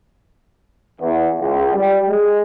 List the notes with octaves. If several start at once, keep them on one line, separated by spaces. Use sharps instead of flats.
E2
C#2
G3
G#3